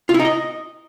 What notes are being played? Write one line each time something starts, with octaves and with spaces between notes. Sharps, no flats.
F4
E4
D#4
D#5